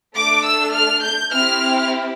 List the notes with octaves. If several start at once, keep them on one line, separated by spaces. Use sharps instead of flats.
A3 D4 A4 D6
E6
F6
G6
C4 E4 G4 F6